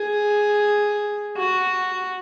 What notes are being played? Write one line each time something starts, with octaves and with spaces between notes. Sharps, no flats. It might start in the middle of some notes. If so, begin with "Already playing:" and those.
Already playing: G#4
F#4